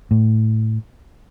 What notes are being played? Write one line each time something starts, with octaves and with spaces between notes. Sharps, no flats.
A2